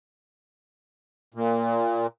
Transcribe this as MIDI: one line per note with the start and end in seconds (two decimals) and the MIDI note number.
1.34 2.07 46